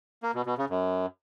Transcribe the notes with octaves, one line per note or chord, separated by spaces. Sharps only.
A#3
B2
B2
C#3
F#2